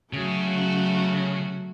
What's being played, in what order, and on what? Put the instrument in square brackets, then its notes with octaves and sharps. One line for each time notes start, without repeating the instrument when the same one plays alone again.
[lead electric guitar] C#3 [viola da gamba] F#3 A3 F#4